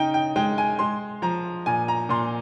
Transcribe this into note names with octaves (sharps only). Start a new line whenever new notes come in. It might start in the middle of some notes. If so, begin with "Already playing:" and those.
Already playing: C#3 D#4 G5
G5
G#3 G5
G#5
G#3 C6
F3 A#5
A#2 G#5
A#5
A#2 C6